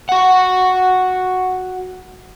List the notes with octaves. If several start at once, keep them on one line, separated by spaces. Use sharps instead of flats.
F#4 F#5